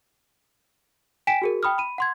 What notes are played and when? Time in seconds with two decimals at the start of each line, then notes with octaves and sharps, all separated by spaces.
1.27 G5 G#5 B6 D7 E7
1.42 F#4 G#4 A#4
1.63 G5 B5 D#6 F6
1.78 B5 D#7
1.98 F#5 C6 G#6